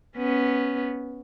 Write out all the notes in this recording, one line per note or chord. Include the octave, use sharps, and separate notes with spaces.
B3 C#4